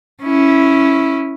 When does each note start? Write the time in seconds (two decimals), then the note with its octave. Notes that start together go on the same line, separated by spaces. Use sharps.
0.23 C#4 E4